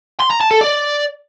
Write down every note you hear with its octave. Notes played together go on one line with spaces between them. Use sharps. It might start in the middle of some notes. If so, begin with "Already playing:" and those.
C6
A#5
A5
A4
D5